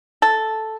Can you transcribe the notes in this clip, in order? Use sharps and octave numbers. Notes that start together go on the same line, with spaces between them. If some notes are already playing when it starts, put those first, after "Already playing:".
A4